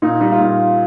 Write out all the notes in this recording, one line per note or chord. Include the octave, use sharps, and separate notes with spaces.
A#2 D#4
G3 D#4
F4
A#2 D#4